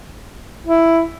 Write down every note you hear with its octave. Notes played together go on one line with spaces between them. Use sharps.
E4